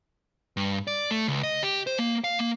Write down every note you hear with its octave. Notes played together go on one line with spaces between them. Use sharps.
G2
D5
A3
C#2
D#5
G4
C5
A#3
F5
A#3